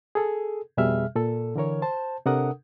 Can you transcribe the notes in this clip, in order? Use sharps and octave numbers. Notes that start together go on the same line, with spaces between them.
G#4 A4
F2 B2 G3 G#4 E5 F6
A#2 A4
D3 E3 A#4 C#5
C5 A5
C3 D4 A4 A#4 F#5 D#6